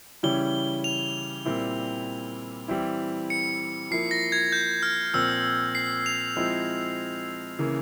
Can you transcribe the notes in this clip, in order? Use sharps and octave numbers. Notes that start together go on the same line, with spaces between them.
C#3 E3 G3 C#4 E4 G7
F7
A#2 G3 C4 E4
E3 G3 C4 E4
C#7
F3 A#3 E4 C7
A#6
G#6
G6
F6
A#2 F3 C4 E6
C7
F7
F3 G#3 C4 E4
C#3 E3 A#3